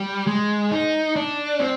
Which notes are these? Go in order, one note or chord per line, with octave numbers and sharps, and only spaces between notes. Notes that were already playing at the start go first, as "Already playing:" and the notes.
Already playing: G3
G#3
D#4
D4
C4